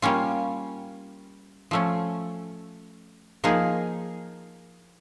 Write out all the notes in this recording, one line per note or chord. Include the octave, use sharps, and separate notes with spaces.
G3 A#3 C#4 F4
F3 A3 C#4
F3 A#3 D#4 G#4